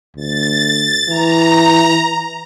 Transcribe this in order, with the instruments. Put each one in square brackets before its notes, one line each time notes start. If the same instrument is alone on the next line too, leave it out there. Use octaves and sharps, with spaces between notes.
[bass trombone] D2 [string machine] A6
[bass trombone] E3 [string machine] A#5